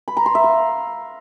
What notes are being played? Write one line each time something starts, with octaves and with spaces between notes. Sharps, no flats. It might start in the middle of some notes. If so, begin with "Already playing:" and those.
B5
A#5
C6
E5
F5